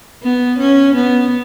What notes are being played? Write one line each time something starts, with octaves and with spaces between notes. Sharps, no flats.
B3
C#4
B3